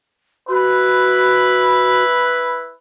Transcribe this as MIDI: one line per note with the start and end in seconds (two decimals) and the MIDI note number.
0.48 2.72 64
0.48 2.03 66
0.48 2.72 71